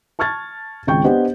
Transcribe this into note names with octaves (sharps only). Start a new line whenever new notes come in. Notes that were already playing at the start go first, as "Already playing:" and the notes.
A5 C#6 F6 G#6 A6
G#1 C#2 G5 C#6 G6
B3 D4 G4 C5 D#5 F#5